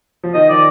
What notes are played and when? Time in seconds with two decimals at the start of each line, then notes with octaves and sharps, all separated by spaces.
0.23 F3
0.34 D#3 D#5
0.49 F3 D5